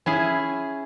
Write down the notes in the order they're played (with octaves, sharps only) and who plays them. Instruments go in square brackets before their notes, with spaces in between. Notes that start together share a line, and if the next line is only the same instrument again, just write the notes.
[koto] C#4 E4 G#4